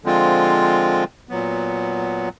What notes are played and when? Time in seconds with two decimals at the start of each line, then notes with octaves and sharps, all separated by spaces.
0.04 D3 F3 G#3 C4 F4
1.29 A#2 F#3 B3